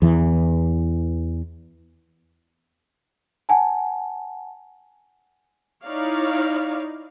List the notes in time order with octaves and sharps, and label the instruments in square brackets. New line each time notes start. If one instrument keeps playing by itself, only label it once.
[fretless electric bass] E2 E3
[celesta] F#5 G#5 A5
[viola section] D#4 E4 C#5 D5 F5